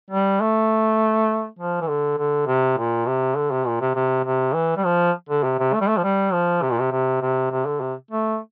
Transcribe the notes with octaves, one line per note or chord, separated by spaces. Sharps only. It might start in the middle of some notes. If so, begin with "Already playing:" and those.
G3
A3
F3
E3
D3
D3
C3
A#2
C3
D3
C3
A#2
C3
C3
C3
E3
G3
F3
D3
C3
C3
A3
G3
A3
F3
G3
F3
C3
A#2
C3
C3
C3
C3
D3
C3
A3